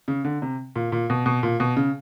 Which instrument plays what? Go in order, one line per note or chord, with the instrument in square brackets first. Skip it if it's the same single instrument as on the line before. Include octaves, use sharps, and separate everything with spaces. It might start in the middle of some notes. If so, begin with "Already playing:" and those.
[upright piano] C#3
D3
C3
A#2
A#2
B2
B2
A#2
B2
C#3